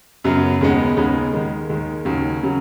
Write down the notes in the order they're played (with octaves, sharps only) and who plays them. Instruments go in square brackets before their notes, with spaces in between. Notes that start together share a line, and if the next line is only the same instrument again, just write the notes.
[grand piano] F#2 C#3 F#3 B3
D#2 C#3 G#3 B3 D#4
D#2 C#3 G#3 B3 D#4
D#2 D#3 G#3
D#2 D#3 G#3
D#2 C#3 F#3
C#3 F#3